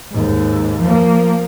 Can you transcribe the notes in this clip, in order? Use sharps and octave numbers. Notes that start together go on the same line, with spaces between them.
D#2 G#2
F3 A#3